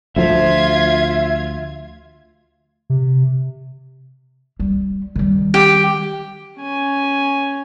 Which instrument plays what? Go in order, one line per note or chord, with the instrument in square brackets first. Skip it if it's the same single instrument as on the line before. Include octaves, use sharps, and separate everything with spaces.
[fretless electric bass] D2 F3 [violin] F4 G#6 [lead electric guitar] E5
[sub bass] C3
[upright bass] G3
D#3 G3
[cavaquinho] G4
[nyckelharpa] C#4 G#5